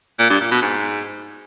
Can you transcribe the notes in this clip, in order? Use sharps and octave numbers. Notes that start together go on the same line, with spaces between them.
A#2
G2
A#2
B2
G#2